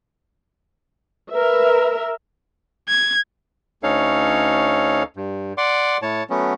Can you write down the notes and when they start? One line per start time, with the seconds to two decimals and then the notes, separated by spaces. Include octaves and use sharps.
1.32 A#4 B4 E5
2.89 G#6
3.83 D2 C#4 D#4 A4 C#5 F5
5.17 G2
5.58 D5 F#5 C6 D6
6.02 A2 C#5 A5
6.30 F#3 A3 B3 C#4